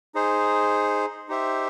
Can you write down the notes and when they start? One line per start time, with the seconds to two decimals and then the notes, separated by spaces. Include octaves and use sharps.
0.15 D#4 G#4 C5
1.29 D#4 G4 C5 E5